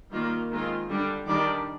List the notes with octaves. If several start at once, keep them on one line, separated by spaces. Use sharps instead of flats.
D#3 G3 A#3 F4
D#3 G#3 C4 F4
D3 G3 D4
D#3 G3 D4 G4 D5